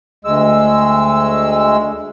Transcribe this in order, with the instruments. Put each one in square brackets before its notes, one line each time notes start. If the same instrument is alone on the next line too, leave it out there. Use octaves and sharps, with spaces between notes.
[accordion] D2 G#3 E6